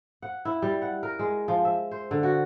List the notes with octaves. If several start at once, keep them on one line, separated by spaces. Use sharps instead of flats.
F#5
E4
G3
F#5
A#4
G#3
F3
E5
C5
D3
F#4